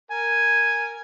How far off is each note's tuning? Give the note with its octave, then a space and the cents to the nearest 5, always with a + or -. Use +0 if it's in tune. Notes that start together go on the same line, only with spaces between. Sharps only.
A#4 -5 G#5 +0